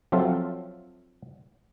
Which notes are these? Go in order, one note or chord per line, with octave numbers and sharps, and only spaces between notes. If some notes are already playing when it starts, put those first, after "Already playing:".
F3 F#3 C4 F4 A4 E5